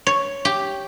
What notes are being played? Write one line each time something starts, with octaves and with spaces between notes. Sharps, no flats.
C#5
G4